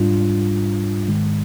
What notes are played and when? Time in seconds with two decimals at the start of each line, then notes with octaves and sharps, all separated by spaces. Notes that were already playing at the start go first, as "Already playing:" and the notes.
Already playing: G#2 G3 D4 F4
1.08 G#2 D#3 G#3